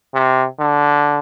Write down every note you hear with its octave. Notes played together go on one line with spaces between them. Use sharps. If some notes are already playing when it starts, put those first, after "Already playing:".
C3
D3